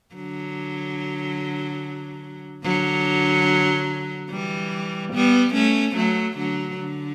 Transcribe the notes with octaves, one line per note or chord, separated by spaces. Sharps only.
D3 F#3
D3 F#3
E3 G3
G3 B3
A3 C#4
F#3 A3
D3 F#3
D3